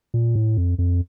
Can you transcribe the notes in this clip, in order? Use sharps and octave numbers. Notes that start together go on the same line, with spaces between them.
A#2
A2
F2
F2